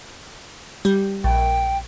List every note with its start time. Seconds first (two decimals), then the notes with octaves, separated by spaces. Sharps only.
0.85 G3 G4
1.24 A#1 G5